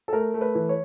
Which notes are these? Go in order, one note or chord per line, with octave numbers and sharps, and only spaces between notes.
A4
A3 A#4
A3
B4
E3
C#5